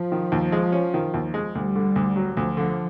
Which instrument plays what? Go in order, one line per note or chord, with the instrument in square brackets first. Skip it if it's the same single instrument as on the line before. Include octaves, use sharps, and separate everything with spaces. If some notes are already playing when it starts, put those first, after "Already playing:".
Already playing: [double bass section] F3
[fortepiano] D#3
D#2
G#3
C#4
D#3
D#2
G#3
[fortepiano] D2 [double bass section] G3
[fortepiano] D3
D2
F#3
[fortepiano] D2 [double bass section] F3
[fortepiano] D3